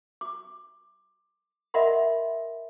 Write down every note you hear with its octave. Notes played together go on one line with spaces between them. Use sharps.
D6
A#4 D#5 E5 F#5 B5 C6